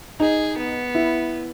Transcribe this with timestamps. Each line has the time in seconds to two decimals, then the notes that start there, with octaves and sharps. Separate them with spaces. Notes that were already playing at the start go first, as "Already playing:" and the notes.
0.20 D#4 G#4
0.57 B3
0.95 E4